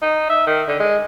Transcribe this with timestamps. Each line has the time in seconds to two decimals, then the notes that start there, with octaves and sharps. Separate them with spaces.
0.01 D#4
0.29 E5
0.47 D#3
0.67 D3
0.80 G#3